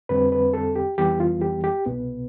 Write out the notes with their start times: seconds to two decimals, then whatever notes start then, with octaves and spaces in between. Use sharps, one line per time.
0.09 F2 D3 G3 C4 B4
0.32 B4
0.54 A4
0.76 G4
0.98 F2 E3 G3 B3 G4
1.20 F4
1.41 G4
1.64 G4
1.86 C2 B2 B3